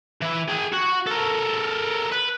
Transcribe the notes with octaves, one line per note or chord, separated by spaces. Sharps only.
E3 E4
G#4 G5
F#4
A4 A#4
B4